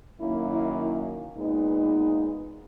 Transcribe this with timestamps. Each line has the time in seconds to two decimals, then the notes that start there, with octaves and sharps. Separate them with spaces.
0.21 F#2 D#3 A#3 C#4 E4
0.50 E4
1.37 A#2 G#3 B3 D#4